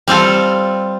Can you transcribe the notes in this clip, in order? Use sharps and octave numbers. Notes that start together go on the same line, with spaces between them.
G3 C4 F4 A4